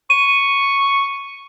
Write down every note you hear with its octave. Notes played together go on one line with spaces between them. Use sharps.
C#6 D#7